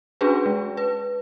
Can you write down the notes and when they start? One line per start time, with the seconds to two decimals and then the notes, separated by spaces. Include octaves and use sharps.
0.21 C#4 D4 F#4 G#4 B4
0.46 G#3
0.77 B4